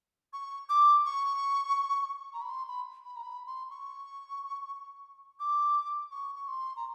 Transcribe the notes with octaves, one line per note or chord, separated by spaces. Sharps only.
C#6
D6
C#6
A#5
B5
C6
B5
B5
A#5
B5
C6
C#6
D6
C#6
C#6
C6
A#5